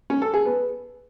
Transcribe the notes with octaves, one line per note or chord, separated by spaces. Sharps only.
C#4
A4
G#4
B3